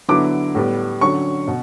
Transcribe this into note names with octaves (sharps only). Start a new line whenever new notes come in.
D3 F#3 B3 E4 D6
A2 G3 B3
D3 F#3 C#4 C#6
B2